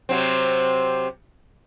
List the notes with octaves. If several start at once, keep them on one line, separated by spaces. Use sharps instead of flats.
C3 F#3 C4